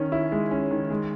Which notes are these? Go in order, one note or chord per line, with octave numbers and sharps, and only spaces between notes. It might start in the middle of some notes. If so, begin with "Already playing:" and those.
Already playing: D#3 C#4
E4
G#3
C#4
D#3
G#3